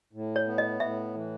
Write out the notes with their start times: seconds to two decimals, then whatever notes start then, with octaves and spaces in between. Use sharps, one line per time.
0.13 A2
0.36 C#5
0.47 B3
0.58 D#5
0.80 A2 E5
1.15 E3